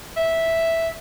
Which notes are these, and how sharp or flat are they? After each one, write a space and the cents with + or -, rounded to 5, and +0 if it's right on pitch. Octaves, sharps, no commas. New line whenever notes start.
E5 -5